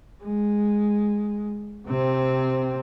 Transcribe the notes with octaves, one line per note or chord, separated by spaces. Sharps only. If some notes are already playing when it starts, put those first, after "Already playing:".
G#3
C3 C4